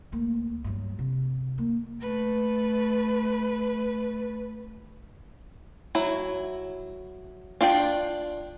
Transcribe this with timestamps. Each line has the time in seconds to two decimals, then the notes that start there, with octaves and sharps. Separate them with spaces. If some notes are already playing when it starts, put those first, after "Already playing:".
0.12 D2 A#3
0.64 G2 F#3
0.99 C3
1.58 A#3
2.01 A3 B4
5.95 F#3 E4
7.61 D4 F4 D5 G5